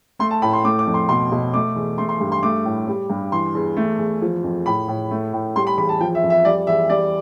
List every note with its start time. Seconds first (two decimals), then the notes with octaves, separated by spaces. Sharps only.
0.19 A3 C6
0.31 A5
0.42 A2 B5
0.53 C6
0.64 A3 D6
0.79 D6
0.87 F2
0.94 C6
1.09 B2 C6
1.32 B2
1.54 A3 D6
1.76 E2
1.98 A3 C6
2.09 C6
2.20 G2
2.32 C6
2.43 A3 D6
2.65 A2
2.87 G3
3.10 G2
3.32 E3 C6
3.55 E2
3.77 A3
3.99 E2
4.22 F3
4.44 F2
4.66 A2 B5
4.88 A2
5.11 A3
5.33 A2
5.56 G3 C6
5.67 B5
5.78 E2 B5
5.89 A5
6.00 F3 G5
6.15 E5
6.23 F2
6.30 E5
6.45 G3 D5
6.67 E2 E5
6.89 G3 D5